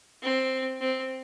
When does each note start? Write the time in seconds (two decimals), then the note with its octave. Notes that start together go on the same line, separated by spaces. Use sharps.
0.22 C4
0.81 C4